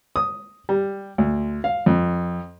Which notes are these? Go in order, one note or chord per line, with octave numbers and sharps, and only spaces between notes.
D#6
G3
D2
F5
F2